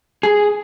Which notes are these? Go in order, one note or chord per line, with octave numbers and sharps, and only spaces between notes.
G#4